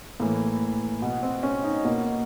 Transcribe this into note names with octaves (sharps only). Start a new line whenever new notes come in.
A2 E3 A#3
B2 B3
C4
C#4
D#4
B2 A#3